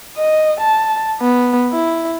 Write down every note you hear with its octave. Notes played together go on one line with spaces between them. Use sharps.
D#5
A5
B3
E4